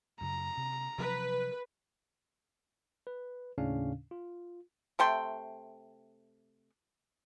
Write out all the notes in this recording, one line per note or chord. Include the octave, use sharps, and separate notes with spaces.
F#2 C#3 A#5
C3
C3 F3 F#3 B4
B4
D#2 A2 C#3 C#4 D4 F5
F4
C3 A3 G5 C6